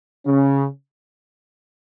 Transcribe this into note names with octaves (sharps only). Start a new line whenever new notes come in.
C#3 C#4